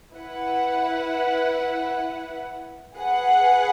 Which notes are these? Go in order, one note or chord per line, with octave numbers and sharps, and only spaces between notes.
E4 B4 F#5
G#4 B4 F#5